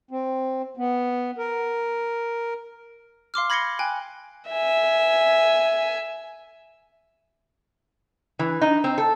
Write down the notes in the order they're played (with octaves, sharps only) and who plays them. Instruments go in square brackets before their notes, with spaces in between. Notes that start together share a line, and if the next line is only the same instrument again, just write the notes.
[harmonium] C4
B3
A#4
[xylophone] F5 C6 D6 F6
B5 G#6 A#6 C7 C#7 G7
G5 G#5 F#6
[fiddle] E5 G#5
[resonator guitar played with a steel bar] E3
D#4
C4
A4